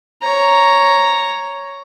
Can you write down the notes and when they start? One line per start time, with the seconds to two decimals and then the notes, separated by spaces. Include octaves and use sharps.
0.22 C#5 A#5